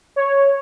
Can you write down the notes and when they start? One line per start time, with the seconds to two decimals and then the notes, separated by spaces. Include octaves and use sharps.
0.16 C#5